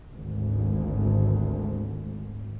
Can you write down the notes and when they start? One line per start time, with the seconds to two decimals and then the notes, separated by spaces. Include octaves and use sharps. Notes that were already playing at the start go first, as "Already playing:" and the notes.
0.12 G#1 D2